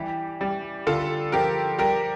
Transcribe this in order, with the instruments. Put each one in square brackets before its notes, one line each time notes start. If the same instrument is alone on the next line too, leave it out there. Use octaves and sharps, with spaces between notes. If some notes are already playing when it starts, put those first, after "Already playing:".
Already playing: [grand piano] E3 G3 G4
G3
D3 F4 A4
F3 G4 A#4
G3 G4 A#4